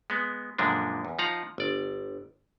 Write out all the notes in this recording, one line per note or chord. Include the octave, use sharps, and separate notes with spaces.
G#3 B3
F#2 A#2 D3 F3 G#3 D4
E2
F3 D#4 F5 F#5 A#5
G1 D5